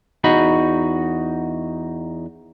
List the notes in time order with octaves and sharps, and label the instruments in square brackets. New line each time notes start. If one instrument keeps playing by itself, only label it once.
[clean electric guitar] E2 D#4 F#4 B5